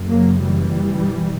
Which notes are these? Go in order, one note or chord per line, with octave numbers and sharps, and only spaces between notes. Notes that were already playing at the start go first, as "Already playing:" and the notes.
Already playing: F#1 F#2 C#3
F#3 A#3
E3 G3
B1